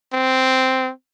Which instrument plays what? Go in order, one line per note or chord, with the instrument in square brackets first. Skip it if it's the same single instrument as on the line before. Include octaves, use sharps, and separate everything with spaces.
[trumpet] C4